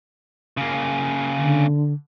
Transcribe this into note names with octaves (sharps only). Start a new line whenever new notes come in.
C#3 A#3
D3